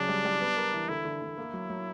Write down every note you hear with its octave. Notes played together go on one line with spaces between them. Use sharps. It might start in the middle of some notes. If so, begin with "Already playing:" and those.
Already playing: C#3 F#3 D4
G3
G3
B3
A#4
E3
D3 E4
D3
D3
A#3
F#3
F#3